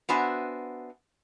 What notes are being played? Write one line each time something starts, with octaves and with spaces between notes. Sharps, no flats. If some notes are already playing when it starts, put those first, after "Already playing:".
B3 D4 F#4 C5 E5 G#5